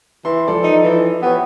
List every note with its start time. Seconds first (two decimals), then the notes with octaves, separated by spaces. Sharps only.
0.25 E3 C6
0.47 F3 A4 D5
0.63 D#4
0.83 E3
1.22 B3 G4 B4 C#5